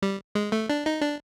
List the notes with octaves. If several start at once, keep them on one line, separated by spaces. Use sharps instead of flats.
G3
G#3
A3
D4
D#4
D4